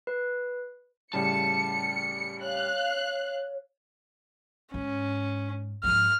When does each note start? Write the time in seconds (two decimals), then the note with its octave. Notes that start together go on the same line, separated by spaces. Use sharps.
0.07 B4
1.13 A2 C#3 G3 A5 C#7
2.41 C#5 F5 F#6
4.74 G#2 C#4
5.84 G#2 F3 F6